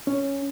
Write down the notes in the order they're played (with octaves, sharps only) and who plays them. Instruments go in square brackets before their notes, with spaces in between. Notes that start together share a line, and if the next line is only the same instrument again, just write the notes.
[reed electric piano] C#4